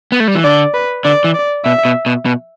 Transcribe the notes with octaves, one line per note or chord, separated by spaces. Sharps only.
B3
A3
G3
E3
D3 D5
B4
D3 D5
E3
D5
B2 E5
B2
B2
B2